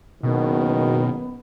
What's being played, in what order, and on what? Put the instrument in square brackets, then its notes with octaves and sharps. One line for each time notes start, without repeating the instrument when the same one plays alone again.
[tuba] F#1 [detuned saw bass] B2 [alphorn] D#3 [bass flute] B3